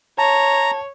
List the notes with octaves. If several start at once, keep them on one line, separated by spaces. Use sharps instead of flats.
C#5 A5 A#5